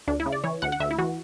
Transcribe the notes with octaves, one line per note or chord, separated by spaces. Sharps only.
D2 D4
E4
C#3
D5
E3 C#5
D2 F#5
F#5
D2 E5
E4
E3 F#4